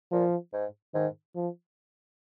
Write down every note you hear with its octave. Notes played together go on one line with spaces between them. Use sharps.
A#2 F3
G#2
G#2 D#3
F3